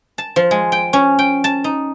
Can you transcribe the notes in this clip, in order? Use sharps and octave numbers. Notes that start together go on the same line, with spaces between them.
A5
F3
G#3
G5
C#4
G5
A5
D#4